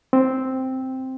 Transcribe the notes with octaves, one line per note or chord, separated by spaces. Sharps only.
C4